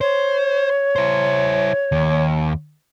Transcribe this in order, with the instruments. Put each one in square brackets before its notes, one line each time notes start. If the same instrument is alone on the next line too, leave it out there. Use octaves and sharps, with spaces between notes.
[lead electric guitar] C5 [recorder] C#5
[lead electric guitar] E4 C5
D#2